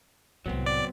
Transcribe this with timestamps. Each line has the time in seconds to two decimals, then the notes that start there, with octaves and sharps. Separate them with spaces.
0.46 C2 A2 F#3 B3 C4
0.66 D5